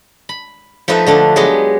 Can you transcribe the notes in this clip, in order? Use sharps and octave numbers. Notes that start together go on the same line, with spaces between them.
B5
F3 A3 D#4 B4 E5
D3 A3 D4
F#3 G#3 B3 G4 G#4 D#5